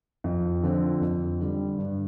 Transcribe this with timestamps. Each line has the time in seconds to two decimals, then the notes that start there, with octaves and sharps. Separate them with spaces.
0.24 F2
0.63 D3 F3 C4
1.01 F2
1.40 D3 G3
1.78 G2